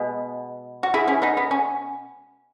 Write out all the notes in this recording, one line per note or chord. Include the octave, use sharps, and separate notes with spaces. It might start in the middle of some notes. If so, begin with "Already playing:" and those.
Already playing: B2 G#3 B3
F#4
E4 G#4
C#4 E4
B3 D#4
B3
C#4